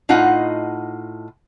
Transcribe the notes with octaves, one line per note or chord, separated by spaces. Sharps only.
A2 D#4 F4 D#5 F#5